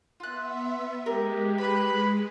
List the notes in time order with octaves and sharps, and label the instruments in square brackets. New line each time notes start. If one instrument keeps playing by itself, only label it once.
[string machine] B3 E5 [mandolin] F4 F#6
[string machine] G#3 [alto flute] G4 [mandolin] A#4 D#5
[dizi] B4 [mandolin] B5